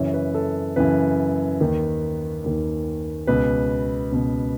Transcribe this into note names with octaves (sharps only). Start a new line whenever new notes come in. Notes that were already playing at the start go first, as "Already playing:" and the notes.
Already playing: F#2 C#3 E3 C#5
B4
A4
F#2 C#3 E3 B4
D#2 D#3
D#2 D#3
C#2 B2 B4
C#2 B2